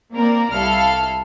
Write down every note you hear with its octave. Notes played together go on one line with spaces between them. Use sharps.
A#3 C4 A#4 D5
C2 E4 A4 F5 F6